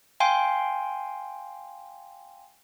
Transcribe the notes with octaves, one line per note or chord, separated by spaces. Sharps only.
F5 G5 G#5 C6